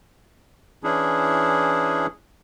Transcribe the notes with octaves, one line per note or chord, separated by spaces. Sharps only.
E3 C#4 D4 E4 G#4